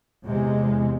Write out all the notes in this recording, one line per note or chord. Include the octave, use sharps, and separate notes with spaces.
E2 C3 G#3